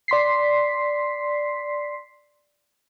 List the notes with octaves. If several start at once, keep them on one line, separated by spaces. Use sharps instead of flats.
D5 C6 B6 C7